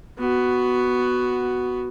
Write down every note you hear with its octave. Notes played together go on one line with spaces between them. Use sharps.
B3 F#4